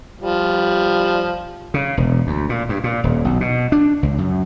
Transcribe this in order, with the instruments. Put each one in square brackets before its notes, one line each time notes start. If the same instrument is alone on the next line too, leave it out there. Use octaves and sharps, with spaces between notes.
[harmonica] F3 G3
[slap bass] C#3
E1
D2
A#2
G2
A#2
D#1
B1
B2
D4
C#2
F#2